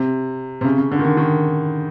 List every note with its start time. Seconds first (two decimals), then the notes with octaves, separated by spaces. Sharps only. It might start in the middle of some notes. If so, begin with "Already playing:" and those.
Already playing: C3
0.61 C3
0.64 C#3
0.78 C#3
0.91 D3
0.99 D#3
1.05 D3
1.17 D#3